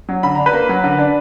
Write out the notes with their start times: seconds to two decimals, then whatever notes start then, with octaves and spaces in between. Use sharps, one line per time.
0.09 F#3
0.23 D3 B5
0.35 D4 A#5
0.46 B4 B5
0.53 A#3
0.69 F#3
0.84 D3
0.99 D4